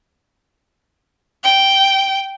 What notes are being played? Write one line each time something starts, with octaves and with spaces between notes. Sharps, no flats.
G5